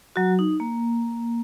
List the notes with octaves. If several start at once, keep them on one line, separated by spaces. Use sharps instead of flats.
F#3 F#4
D#4
A#3